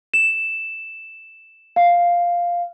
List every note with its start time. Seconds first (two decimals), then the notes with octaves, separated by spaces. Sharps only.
0.14 E7
1.76 F5